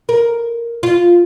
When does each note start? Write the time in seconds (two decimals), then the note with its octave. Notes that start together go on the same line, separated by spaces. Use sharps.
0.09 A#4
0.83 F4